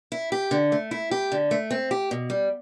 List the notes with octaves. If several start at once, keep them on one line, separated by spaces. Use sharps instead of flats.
E4
G4
D3
A3
E4
G4
D3
A3
C4
G4
B2
G3